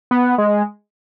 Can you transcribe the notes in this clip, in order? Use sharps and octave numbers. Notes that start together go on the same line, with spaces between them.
B3
G#3